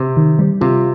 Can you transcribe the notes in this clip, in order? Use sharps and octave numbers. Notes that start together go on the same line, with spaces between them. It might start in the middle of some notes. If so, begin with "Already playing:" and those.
Already playing: C3
D#3
G3
C3 F4